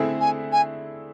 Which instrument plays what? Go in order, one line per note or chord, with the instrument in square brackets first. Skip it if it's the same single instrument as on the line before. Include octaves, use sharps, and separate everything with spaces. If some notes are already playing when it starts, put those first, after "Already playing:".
Already playing: [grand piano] D3 A3 C4 E4 G#4
[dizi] G#5
G#5